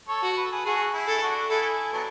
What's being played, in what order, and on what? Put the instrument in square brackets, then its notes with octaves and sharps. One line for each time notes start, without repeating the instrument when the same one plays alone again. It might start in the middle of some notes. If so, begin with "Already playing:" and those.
[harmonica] A4 C#5
[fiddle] F#4
[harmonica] B4
A4
G#4 B4
[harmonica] F#4 A4 [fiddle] G#4
[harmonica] E4 G#4
[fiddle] A4
[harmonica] D4 F#4
[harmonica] E4 G#4 [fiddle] A4
[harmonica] F#3 B3 D4